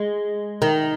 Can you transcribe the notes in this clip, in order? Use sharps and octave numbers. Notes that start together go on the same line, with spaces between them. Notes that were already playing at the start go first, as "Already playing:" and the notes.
Already playing: G#3
D#3